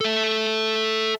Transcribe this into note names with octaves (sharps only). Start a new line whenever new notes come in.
A4 E5